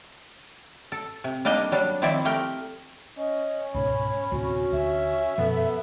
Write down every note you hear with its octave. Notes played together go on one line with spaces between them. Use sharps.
A4
C3
G3 A#3 D4 D#4 D#5
F#3 G3 D4
D#3 F3 C4 E4 D5 E5
A3 G4 A#4 G5
C#4 D#5
C#2 G#2 B2 C#5 B5
D2 A2 C3 F#4
D2 E5
F#2 B2 F3 B3 A4